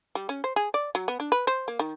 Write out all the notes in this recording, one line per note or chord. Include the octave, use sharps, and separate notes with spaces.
G3
C#4
C5
G#4
D5
F#3
B3
D4
B4
C5
A#3
D#3